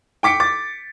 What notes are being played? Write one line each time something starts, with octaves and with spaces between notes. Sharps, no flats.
G5 D6 B6 C#7 D7
D6 A6